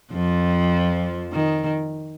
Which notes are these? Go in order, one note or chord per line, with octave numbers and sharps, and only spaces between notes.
F2 F3
D#3